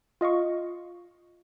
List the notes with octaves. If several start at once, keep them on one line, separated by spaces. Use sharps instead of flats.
F4 D#5 F5 C#6